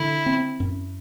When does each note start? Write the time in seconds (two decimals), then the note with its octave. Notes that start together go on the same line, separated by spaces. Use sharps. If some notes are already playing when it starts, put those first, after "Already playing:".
Already playing: D3 E4
0.26 C4
0.60 F#2